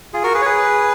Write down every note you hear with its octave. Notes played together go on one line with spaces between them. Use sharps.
F4 G#4
F#4 A#4
G#4 B4
C#5
G#4 B4